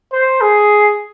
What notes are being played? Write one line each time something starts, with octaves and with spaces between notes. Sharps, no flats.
C5
G#4